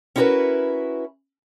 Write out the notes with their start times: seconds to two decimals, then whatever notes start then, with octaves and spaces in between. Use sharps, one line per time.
0.16 C#4 E4 F#4 G4 A#4 B4